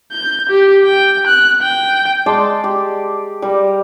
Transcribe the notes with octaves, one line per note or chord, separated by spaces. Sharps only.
G6
G4
G5
F#6
G5
G#3 D5 A5 C6
G4
G3 A#4